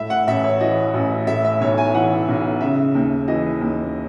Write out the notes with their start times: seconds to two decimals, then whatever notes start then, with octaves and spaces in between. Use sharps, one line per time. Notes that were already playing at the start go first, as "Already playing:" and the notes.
Already playing: A2 E5
0.10 F#5
0.27 A1 E5
0.44 C#5
0.60 E3 D#5
0.94 A1
1.27 A2 E5
1.45 E5
1.61 B1 C#5
1.78 G#5
1.94 E3 F#5
2.28 B1
2.61 C#3 E5
2.95 D#2
3.28 E3 D#5
3.61 D#2